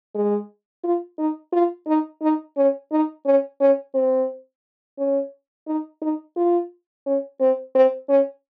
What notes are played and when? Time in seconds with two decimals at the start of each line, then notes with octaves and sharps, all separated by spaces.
0.15 G#3
0.84 F4
1.18 D#4
1.53 F4
1.87 D#4
2.22 D#4
2.57 C#4
2.91 D#4
3.26 C#4
3.60 C#4
3.94 C4
4.98 C#4
5.67 D#4
6.02 D#4
6.36 F4
7.06 C#4
7.40 C4
7.75 C4
8.09 C#4